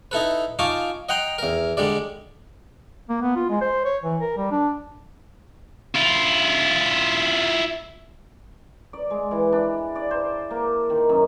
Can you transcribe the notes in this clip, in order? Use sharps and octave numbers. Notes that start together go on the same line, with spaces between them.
D#4 E4 A4 B4
D#4 F4 G#5 A5 C#6 D6
D#5 F#5 G5 A#5 C6
E2 A#4
D3 G3 G#3 D5
A#3
B3
F4
G#3
C5
C#5
E3
A#4
G3
D4
E4 F4
D5
G#3
E3
D4
D5
C5
A#3
D#3
F#2